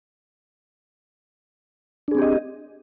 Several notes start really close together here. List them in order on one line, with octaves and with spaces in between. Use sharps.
D4 G#4 C4 G4 D#5